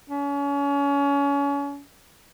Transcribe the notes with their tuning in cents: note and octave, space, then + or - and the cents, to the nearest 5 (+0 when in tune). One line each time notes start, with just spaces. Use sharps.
C#4 +30